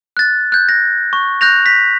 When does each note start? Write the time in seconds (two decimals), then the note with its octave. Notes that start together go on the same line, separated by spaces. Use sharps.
0.17 F#6 A6
0.52 F#6 G6
0.69 A#6
1.13 C#6
1.41 F#6 G6 A#6 F7
1.66 B6